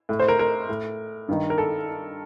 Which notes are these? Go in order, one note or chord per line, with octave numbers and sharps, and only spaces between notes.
A2
C5
A#4
A#4
A2
G2 D#3
A#4
A4